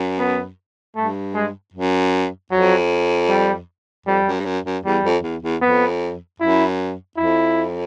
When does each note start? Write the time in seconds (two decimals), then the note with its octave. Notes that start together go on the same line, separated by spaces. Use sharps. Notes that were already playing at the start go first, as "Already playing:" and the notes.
Already playing: F#2
0.19 B3
0.96 G2 A3
1.34 G#3
1.74 F#2
2.51 F2 F#3
3.28 G3
4.06 F2 G3
4.26 F#2
4.40 G2
4.45 F#2
4.65 F#2
4.85 E2 G3
5.03 F2
5.23 E2
5.43 E2
5.61 F2 B3
6.40 F#2 E4
7.17 F2 E4